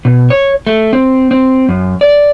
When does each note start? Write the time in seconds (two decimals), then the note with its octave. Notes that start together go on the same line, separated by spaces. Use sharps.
0.05 B2
0.30 C#5
0.67 A3
0.93 C4
1.31 C4
1.69 F#2
2.01 D5